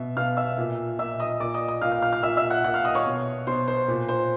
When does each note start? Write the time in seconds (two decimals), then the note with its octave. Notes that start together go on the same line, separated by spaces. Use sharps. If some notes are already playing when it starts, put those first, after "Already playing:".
Already playing: B2 E5
0.17 B2 F5 F6
0.37 E5 E6
0.58 A#2
0.99 A#2 E5 E6
1.20 D#5 D#6
1.40 A#2 D5 D6
1.54 D#5 D#6
1.68 D#5 D#6
1.82 A#2 F5 F6
1.92 F5 F6
2.02 F5 F6
2.13 F5 F6
2.23 A#2 E5 E6
2.37 E5 E6
2.50 F#5 F#6
2.64 A#2 F#5 F#6
2.74 F5 F6
2.85 D#5 D#6
2.95 C#5 C#6
3.06 B2
3.47 B2 C5 C6
3.68 C5 C6
3.88 A#2
4.08 C5 C6